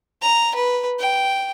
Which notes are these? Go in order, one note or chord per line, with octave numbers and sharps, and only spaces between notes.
A#5
B4
G5